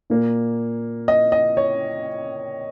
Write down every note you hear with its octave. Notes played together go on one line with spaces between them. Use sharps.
A#2 A#3
D#5
D#5
C#5